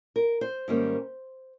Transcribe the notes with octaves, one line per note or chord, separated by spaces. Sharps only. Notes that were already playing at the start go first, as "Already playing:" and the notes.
A#4
C5
G#2 D#3 G3 A#3 C#4